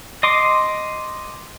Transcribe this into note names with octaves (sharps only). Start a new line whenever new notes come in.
D#5 C6 D6